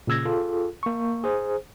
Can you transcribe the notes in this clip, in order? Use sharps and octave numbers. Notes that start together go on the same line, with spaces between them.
A#2 C#3 E6 G#6 A#6
F4 G#4 A4
A#3 C#6
G#4 C5